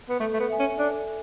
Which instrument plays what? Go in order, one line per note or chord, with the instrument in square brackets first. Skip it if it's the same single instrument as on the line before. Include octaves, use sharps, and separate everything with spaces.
[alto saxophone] B3
[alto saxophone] A3 [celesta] A4
[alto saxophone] A3
B3
[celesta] E5 G#5
[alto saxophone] C#4
[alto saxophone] D4 [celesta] A4